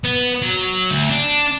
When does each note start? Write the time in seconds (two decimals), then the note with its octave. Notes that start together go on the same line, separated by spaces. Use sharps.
0.04 B3
0.42 F#3
0.91 D2
1.10 D4